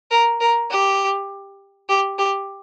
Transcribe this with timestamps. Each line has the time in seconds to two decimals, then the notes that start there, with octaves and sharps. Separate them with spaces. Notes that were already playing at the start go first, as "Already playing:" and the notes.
0.11 A#4
0.41 A#4
0.71 G4
1.89 G4
2.18 G4